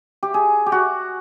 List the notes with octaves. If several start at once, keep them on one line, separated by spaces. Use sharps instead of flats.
G4
G#4
G4
F#4